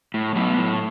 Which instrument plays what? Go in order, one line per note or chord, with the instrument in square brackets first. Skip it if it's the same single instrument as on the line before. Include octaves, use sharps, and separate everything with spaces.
[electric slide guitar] A2
F#3 B3
A2